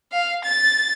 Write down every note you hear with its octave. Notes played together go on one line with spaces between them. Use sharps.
F5
A6